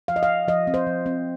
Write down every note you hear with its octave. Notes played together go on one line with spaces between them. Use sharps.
F3 F5
D#5
F5
F3
F3 D#5
C4
C5
F3
C4